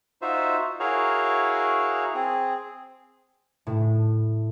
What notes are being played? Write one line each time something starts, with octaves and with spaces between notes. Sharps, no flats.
D#4 F4 F#4 C5 E5
E4 F#4 G#4 A#4 C#5 F5
C4 G#4
A2